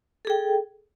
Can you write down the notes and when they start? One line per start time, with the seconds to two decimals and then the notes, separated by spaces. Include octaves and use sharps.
0.25 A4
0.27 G#4
0.30 G5